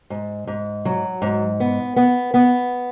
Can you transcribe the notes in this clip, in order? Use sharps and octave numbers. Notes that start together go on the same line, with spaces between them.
G#2
G#2
F#3
G#2
B3
B3
B3